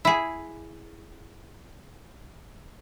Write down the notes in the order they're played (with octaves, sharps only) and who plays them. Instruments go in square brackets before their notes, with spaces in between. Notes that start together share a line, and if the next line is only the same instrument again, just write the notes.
[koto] E4 G#4